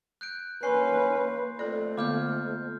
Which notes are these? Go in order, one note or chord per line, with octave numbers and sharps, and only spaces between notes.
F#6 G6 D7
A#3 C#4 B4 C6 C7
F2 A3 A4 D5
D3 A#3 B3 D6 F6 G6